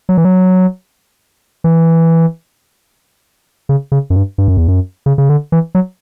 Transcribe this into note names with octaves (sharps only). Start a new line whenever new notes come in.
F#3
E3
F#3
E3
C#3
C#3
F#2
G2
G2
F#2
E2
F#2
C#3
C#3
D3
E3
F#3